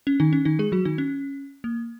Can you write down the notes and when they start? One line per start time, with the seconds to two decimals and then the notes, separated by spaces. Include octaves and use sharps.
0.07 C#4
0.20 D#3 D#4
0.33 C#4
0.45 D#3 D#4
0.59 G#3 G#4
0.72 F#3 F#4
0.85 D#3 D#4
0.98 C#4
1.64 A#3